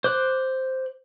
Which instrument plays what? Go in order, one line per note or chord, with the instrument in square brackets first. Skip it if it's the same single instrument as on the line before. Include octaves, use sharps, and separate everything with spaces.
[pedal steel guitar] C5 D6 F#6